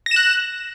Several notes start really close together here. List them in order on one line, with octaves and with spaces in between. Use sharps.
A#6 E7 F#6